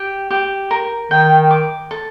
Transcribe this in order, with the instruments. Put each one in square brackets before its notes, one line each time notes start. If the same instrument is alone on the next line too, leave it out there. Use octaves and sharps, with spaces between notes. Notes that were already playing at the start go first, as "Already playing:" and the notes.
Already playing: [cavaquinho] G4
G4
A#4
[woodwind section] D#3 [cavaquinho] G5
[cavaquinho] D6
A4